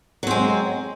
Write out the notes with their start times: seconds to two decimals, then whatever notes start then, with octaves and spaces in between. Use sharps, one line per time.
0.23 F#3
0.27 C4
0.31 G#3